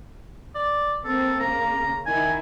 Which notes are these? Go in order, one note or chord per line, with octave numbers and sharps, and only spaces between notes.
D5
A#3 C4 A4
C#3 A#3 A#5
D#3 E4 G#5